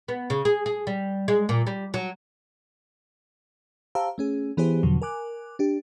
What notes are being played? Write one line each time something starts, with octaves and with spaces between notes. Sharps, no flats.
B3
C#3
G#4
G#4
G3
G#3
A#2
G3
F#3
G4 C5 F5 A5 A#5 E6
A3 C#4 G#4
E3 B3 E4 G4 G#4 C5
E2 B2 D3 F3 F#3
A#4 G#5 D6 F#6
D4 G4